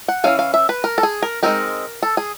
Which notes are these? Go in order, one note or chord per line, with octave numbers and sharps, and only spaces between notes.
F#5
E3 A3 C#4 F5
F5
E5
B4
A#4
A4
G#4
A#4
G#3 C4 D#4 A#4
A4
G#4